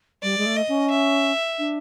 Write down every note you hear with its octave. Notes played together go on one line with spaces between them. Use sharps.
G3 D5
G#3
A3
D#5
C#4
E5
D4